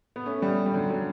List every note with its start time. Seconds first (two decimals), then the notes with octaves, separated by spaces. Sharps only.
0.16 B3
0.26 A3 C#4
0.42 G3 B3
0.66 G3
0.74 D3 F#3
0.90 D3 F#3